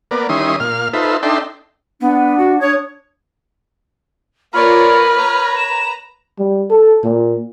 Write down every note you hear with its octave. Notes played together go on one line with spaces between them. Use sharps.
A#3 B3 D5
D#3 G3 C#4 E4 C6 D#6
A#2 F5 F6
D#4 F4 A4 B4 C5 E5
D4 D#4 A4 E5 G5 C6
B3 D4 F#5
F#4
D4 C#5 D#6 G#6
A#3 F4 A#4 B4 C#5 D5 F6
C#5 A#5
E7
G3
A4
A#2